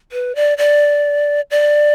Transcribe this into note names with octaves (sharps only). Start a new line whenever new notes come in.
B4
D5
D5
D5